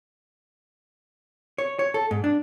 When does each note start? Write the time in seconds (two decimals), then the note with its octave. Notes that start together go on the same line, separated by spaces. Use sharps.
1.58 C#5
1.79 C#5
1.94 A4
2.11 G#2
2.24 D4